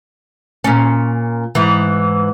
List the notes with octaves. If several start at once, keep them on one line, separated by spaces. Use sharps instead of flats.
A#2 C#4
G#2 E3